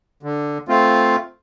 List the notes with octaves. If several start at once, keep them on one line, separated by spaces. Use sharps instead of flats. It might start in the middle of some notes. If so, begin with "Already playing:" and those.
D3
A3 C4 F4